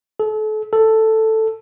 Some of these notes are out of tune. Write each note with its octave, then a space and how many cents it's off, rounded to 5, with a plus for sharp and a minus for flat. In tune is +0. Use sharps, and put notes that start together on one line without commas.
A4 -35
A4 +5